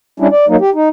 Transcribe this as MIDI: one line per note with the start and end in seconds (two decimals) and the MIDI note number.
0.20 0.27 55
0.20 0.27 61
0.20 0.27 62
0.20 0.27 64
0.32 0.45 74
0.49 0.56 54
0.49 0.56 58
0.49 0.56 63
0.61 0.70 67
0.75 0.89 63